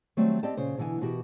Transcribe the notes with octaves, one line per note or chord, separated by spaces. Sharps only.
D#3 F#3 G3 A3 C4
C4 G4 D5 D#5 G5 A5
A#2 C#3 C5
B2 D3 E3 B3 G#5
B2 E3 F#4 G4 A#4